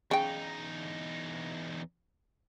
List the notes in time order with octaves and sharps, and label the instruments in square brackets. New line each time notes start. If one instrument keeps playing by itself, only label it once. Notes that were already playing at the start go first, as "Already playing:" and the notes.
[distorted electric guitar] E2 D#4 [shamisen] C#3 G5